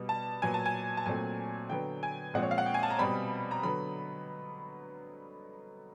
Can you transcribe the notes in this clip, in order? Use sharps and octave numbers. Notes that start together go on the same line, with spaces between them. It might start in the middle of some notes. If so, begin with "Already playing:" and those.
Already playing: B2 G3 B3
A5
A#2 F#3 B3 G#5
A5
G#5
A5
A#2 F#3 A3 C4 G#5
D3 F#3 B3 G5
G#5
A#2 F3 G#3 C4 F#5
C#5
F5
F#5
G5
G#5
A5
A#5
B2 G3 C4 B5
A#5
D3 F#3 B3 B5